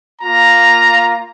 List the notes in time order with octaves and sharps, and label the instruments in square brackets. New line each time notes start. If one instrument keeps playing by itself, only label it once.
[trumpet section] A#3 F4 A#5